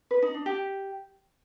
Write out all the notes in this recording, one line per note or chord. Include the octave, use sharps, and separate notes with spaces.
B4
D#4
D4
G4